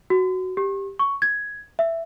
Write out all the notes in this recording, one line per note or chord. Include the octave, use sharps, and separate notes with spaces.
F#4
G4
C#6
G#6
E5